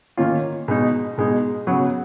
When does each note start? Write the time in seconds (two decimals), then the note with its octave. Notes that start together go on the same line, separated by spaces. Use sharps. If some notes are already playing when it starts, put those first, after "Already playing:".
0.17 D#3 A#3 C#4 F4
0.68 B2 G#3 D#4
1.18 B2 G#3 D#4
1.67 C#3 F#3 B3 F#4